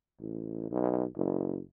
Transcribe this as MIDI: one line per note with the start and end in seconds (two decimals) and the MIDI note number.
0.20 0.68 33
0.71 1.05 35
1.17 1.59 30